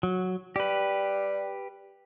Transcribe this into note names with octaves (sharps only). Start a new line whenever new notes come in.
F#3
G3 G4 B4